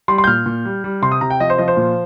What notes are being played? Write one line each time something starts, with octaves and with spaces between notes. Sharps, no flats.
G3 C6
C6
G6
A#2 F6
A#2
G3
G3
C3 C6
D#6
C3 A#5
G5
F3 D#5
C5
F3 D#5
C5
A#2